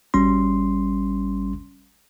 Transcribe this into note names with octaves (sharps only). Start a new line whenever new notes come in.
G#1 G3 C#4 C6